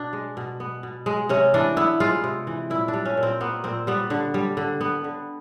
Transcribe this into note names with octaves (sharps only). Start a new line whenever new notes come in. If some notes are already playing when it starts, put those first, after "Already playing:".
Already playing: B2 D4
G#3
B2
B3
B2
G#3
C3 C#4
E3 D4
B3 E4
G#3 F4
C3
E3
A#2 E4
D4
G3
C#4
A#2
C4
A#3 B3
A#2 C4
G3 B3
D3
G3
D3
B3
D3